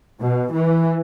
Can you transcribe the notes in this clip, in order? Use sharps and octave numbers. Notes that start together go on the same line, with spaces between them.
B2
E3